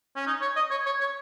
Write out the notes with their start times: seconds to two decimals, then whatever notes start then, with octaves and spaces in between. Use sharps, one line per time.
0.16 C#4
0.27 D#4
0.42 C#5
0.56 D#5
0.71 C#5
0.86 C#5
1.01 C#5